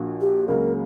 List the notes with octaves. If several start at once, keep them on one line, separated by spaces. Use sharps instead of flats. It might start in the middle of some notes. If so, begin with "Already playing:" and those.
Already playing: A#1 A#2 A#3 D4 F#4
G4
C#2 C#3 F#3 A#3 A#4